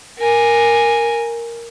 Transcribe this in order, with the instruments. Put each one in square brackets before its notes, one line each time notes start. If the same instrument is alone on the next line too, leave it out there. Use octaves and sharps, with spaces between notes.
[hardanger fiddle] A#4 G#5